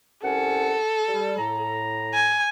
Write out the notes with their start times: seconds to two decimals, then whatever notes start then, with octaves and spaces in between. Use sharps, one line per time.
0.24 C2 C#4 A4 F#5
1.09 G3
1.38 A2 A#5
2.14 G#5